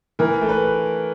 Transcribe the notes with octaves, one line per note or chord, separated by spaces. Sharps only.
E3 A#4
A3
B4